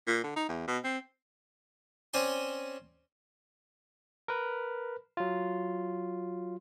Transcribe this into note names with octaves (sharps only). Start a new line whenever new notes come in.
A#2
D3
D#4
E2
B2
C4
C4 C#4 C5 D5 G#5 C6
A#4 B4
F#3 F4